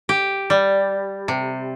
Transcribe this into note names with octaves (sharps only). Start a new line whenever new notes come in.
G4
G3
C3